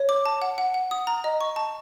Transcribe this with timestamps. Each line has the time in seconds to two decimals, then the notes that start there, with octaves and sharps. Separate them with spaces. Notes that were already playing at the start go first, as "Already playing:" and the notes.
Already playing: C#5
0.09 D6
0.26 A5
0.42 F#5
0.58 F#5
0.74 F#5
0.91 D#6
1.07 A#5
1.24 D#5
1.41 C#6
1.56 A5